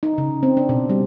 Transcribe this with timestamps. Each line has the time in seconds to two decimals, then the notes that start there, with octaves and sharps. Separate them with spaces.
0.03 D#4
0.18 C#3
0.43 C4
0.57 D4
0.69 B2
0.89 G3